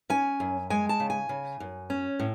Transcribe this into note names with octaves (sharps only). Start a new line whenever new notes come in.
C#4 G#5
F#2
G#3 G#5
A5
C#3
G#5
C#3
F#2
C#4
A2